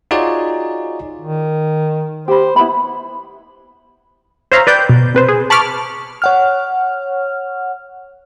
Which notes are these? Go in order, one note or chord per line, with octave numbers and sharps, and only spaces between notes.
D#4 F4 F#4 G#4 C#5 D5
D#3
G4 C5 B5
B3 E4 E5 B5
C5 C#5 E5 F5 A#5
B4 D5 G5 G6
B2
C3 B4 C5
G#4
A5 B5 C#6 D6 F6
C#5 F#5 F6